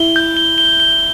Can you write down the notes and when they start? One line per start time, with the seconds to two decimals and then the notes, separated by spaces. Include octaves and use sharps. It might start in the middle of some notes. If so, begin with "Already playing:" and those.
Already playing: E4 G7
0.16 G6
0.37 G7
0.58 G7
0.80 G7